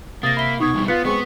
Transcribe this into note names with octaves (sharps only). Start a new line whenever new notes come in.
C3 A#3 D#6 A6 A#6
E5 B5 G7
B2 D#4 C#6 D#6 G#6
G2 B2 G3
B3 F4 B4 F#6 B6 C#7
G#3 B3 C4 F#4 C#6